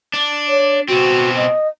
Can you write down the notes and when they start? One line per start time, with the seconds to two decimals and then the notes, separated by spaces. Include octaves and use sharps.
0.14 D4
0.48 C#5
0.88 B2 C4 F#4
1.36 D#5